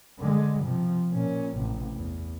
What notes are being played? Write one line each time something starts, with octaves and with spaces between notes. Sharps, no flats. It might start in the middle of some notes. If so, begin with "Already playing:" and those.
D3 G#3
C3 F3
A#2 C#4
A1 C3
E2